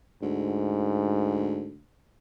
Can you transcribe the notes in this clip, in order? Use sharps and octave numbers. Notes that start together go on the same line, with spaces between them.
D2 G#2